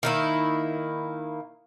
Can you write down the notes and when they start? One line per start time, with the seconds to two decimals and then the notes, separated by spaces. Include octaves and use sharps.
0.03 D#3 A#3 E4